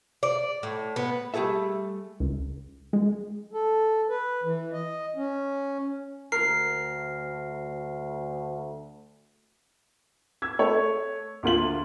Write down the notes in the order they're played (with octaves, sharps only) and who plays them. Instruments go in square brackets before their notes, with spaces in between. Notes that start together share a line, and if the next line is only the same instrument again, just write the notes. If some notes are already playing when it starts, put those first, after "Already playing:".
[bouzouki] D5
A2
B3
[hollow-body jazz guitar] G3 A3 G#4 A4 E5
[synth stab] C#2
G#3
[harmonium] A4
B4
E3
D#5
C#4
[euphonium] D2 [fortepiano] A#4 [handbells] C7
[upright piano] E6 G#6
A3 C#5
D2 A#3 F4 F#7